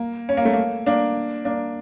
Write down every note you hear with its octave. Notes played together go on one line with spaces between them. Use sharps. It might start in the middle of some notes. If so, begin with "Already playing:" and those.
Already playing: A#3
C#4
A#3
A3
A#3
A#3 D4
A#3 D4